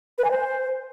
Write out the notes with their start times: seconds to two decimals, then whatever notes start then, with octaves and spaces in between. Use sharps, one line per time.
0.18 B4
0.24 G#5
0.30 C5